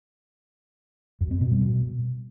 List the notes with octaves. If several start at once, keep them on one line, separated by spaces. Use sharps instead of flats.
F#2
C4
B2
G3
B2